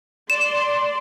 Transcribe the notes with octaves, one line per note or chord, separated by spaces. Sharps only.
D5 C6 E7